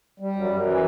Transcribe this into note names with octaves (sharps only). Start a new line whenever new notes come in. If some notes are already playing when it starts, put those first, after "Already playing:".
G3
F#2
F#2
E3